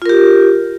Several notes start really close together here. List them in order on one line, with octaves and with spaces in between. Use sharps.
F4 A#4 G4